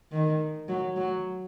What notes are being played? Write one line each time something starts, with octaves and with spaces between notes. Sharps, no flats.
D#3
F#3
F#3